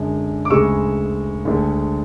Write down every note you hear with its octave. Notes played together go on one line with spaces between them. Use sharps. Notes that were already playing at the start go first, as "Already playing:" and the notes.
Already playing: F#2 D3 G#3
D6
D2 C#3 G#3 C#6 E6
D2 D3 G#3